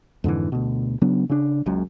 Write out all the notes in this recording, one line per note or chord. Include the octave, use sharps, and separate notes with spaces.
F2 G#2 D3 E3
D2 B2
C#3 F#3 B3 D4
C#3 D4
F#1 C#2 F#2